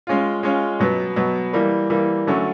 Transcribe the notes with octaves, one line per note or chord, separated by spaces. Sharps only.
G#3 C#4 F4
G#3 C#4 F4
B2 F#3 B3
B2 F#3 B3
E3 G3 A#3
E3 G3 A#3
D3 F#3 A3 C#4